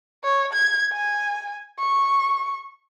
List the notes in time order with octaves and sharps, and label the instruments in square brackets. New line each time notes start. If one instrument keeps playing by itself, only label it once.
[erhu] C#5
G#6
G#5
C#6